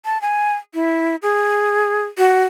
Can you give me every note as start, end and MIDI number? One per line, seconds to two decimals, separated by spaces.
0.05 0.21 81
0.22 0.54 80
0.74 1.16 64
1.22 2.03 68
2.18 2.44 66